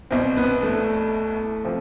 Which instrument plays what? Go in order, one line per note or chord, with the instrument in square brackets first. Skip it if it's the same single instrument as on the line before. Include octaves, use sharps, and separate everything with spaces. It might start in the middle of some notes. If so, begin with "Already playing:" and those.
[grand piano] C2 B2 C4
B3
A3
C3 F3